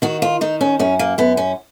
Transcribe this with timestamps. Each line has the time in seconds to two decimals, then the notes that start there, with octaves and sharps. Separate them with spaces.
0.02 D#3 F#4
0.22 F4
0.41 D#3 D#4
0.61 C#4
0.79 F#2 C#4
0.99 A#3
1.18 F#2 B3
1.37 C#4